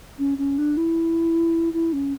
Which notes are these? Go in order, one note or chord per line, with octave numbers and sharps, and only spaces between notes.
C#4
C#4
D4
E4
E4
C#4